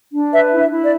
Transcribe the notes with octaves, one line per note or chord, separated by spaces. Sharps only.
D4
B4 E5
E4
E5
E4
D5